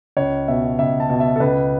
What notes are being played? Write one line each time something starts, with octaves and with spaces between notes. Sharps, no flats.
C#2 C#5
B2 E5
C#2 E5
A5
B2
E5
A4
C#2 B4